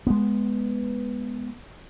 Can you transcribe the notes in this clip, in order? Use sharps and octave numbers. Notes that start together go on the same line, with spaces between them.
G#3 B3